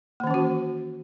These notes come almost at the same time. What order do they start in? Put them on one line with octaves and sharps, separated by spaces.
A#3 D#3 C#4 E3 F#4